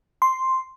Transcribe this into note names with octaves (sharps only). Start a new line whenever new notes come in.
C6